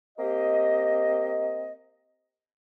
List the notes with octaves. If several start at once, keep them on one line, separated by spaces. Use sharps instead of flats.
A#3 C4 G4 D#5